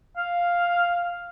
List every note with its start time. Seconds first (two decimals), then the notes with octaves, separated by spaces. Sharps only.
0.17 F5